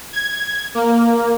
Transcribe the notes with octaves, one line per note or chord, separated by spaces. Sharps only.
G#6
A#3